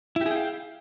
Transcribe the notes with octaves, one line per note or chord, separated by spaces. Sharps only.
E4 G4 G#4 F5 G5